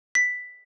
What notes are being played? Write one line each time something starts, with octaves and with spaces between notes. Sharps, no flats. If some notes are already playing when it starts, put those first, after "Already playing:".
B6